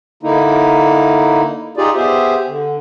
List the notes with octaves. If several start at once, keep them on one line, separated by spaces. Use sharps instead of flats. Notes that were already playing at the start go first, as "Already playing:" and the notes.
D3 A#3 D#4 E4
D#4 F4 G4 G#4 D5
B3 G4 G#4 C5 E5
D3